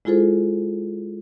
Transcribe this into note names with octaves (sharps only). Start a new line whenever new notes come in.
G#3 E4 F4 G#4 A4 C5